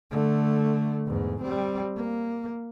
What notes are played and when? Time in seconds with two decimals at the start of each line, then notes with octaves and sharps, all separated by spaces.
0.11 D3 A3
1.06 E2 G#2
1.41 G3 C4
1.96 A#3